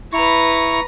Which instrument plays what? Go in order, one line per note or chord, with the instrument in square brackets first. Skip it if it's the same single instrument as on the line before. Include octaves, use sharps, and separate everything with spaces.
[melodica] E4 C#6 [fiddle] B4 A#5